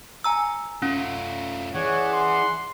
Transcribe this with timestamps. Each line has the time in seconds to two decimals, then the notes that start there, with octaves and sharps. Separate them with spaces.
0.24 G#5 A#5 E6
0.82 A3 C#4 F4
1.75 E3 G#4 C#5 D5 F#5
2.13 C6